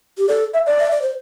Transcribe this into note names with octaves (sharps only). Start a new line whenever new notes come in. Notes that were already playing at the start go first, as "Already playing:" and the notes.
G4
A4 D5
E5
D5
E5
D5
C5